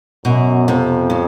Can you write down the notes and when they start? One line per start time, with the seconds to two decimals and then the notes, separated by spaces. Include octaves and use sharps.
0.25 F#2 B2
0.68 F2 C3
1.10 C#3